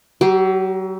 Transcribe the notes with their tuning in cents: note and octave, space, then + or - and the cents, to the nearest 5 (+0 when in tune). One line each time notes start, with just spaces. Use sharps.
F#3 +35 G4 +0